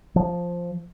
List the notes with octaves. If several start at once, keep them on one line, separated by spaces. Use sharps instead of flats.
F3